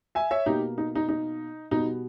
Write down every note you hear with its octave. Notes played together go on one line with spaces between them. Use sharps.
E5 G#5
C#5 E5
B2 A#3 D#4 G4
D#4
D#4
D#4
B2 G3 B3 D#4